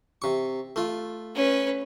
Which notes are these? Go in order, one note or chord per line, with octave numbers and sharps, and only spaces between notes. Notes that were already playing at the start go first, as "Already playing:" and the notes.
C3 C#6
A3 F4
C#4 B4